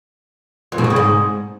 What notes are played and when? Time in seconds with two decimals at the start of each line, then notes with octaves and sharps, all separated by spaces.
0.72 F2
0.78 B2
0.84 A2
0.90 C#3
0.96 G#2